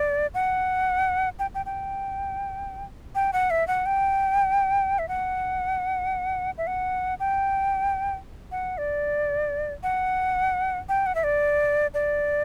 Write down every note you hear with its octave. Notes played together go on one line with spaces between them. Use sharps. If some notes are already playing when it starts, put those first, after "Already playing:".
Already playing: D5
F#5
G5
G5
G5
G5
F#5
E5
F#5
G5
E5
F#5
E5
F#5
G5
F#5
D5
F#5
G5
F#5
E5
D5
D5